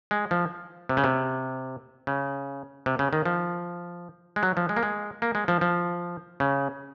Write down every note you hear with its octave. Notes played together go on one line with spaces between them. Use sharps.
G#3
F3
C3
C#3
C3
C#3
C3
C#3
D#3
F3
G#3
F#3
F3
G#3
A#3
G#3
A#3
G#3
F3
F3
C#3